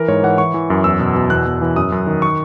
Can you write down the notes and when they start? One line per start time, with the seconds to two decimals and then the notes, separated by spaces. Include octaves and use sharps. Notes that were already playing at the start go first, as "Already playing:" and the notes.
Already playing: E3 A#4
0.08 G#2 C#5
0.23 E3 F#5
0.38 E3 C#6
0.54 E3
0.70 F#2
0.84 E2 E6
1.00 B2
1.16 B2
1.30 E2 F#6
1.46 E2
1.62 E3
1.76 F#2 D#6
1.92 F#2
2.07 D#3
2.22 C#6